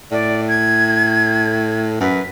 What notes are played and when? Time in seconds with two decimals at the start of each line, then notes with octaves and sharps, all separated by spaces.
0.11 A2 D5
0.49 G#6
2.00 F#2 B4